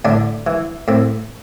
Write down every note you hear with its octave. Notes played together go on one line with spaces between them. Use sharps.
A2 D3 D4
E3
A2 C4